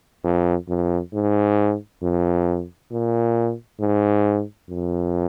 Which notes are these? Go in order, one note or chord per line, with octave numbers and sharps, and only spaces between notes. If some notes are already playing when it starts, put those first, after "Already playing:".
F2
F2
G#2
F2
A#2
G#2
F2